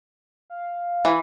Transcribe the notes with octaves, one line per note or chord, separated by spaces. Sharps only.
F5
E3